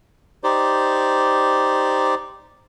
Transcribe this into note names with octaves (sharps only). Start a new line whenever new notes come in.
D#4 G4 C5 D5